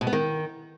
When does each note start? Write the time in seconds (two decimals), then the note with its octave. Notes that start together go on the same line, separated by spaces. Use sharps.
0.01 B2
0.07 B3
0.13 D#3